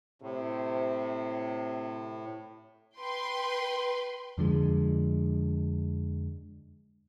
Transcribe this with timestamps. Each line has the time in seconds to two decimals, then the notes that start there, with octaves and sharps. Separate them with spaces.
0.22 A2 C3
2.99 B4 G5 C6
4.38 F2 D3 F3 G#3